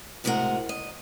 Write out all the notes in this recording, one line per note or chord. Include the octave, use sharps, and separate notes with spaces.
A2 C3 G#3 F#4 A#4 F#5
D#5